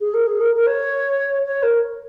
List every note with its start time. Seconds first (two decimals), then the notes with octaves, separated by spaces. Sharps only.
0.01 G#4
0.14 A#4
0.26 G#4
0.40 A#4
0.55 A#4
0.66 C#5
1.46 C#5
1.62 A#4